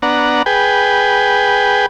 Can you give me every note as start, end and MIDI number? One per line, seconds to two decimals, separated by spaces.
0.02 0.42 59
0.02 0.42 62
0.02 0.42 78
0.02 0.42 82
0.46 1.86 68
0.46 1.86 71
0.46 1.86 79